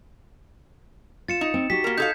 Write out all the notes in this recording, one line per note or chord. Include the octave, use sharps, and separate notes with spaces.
F4 A6 C#7 E7
D#4
C4
F#4 G4 B6
A#3 A#4
D#4 A4 F5 G6 G#6